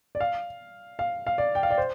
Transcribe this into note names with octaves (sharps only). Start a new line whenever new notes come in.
D5
F5
F5
F5
D5
G5
F5
D5
C5